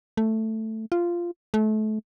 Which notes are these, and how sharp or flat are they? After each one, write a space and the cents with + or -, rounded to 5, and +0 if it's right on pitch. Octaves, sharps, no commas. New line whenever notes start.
A3 +5
F4 -10
A3 -30